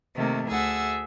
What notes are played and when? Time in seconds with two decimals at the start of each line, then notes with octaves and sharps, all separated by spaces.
0.15 C3 D#3 A3 A#3
0.48 D2 G#4 E5 F#5 E6 A6